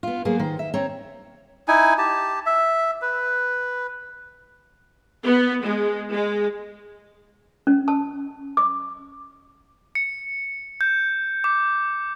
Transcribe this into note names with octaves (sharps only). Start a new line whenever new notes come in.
B3 F4
F#3 A#3 B3 G#4
D#3 C5
E5
C4 C#5 A#5
D#4 E4 G#5
G4 A5
E5
B4
B3
G#3
G#3
C#4
A5
D6
C#7
G6
D6